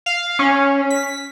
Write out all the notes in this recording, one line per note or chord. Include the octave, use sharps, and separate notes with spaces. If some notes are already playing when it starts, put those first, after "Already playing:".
F5
C#4
B6